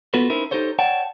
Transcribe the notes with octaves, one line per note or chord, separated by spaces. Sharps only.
B3 F4 F#4 A4 B4
C#4 D#4 E4 A#4 C5
D#4 G4 A4 C5 C#5
C#5 D5 F#5 G5 A5